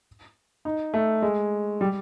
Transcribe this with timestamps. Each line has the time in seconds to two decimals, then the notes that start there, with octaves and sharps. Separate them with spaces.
0.65 D#4
0.94 A3
1.22 G#3
1.81 G3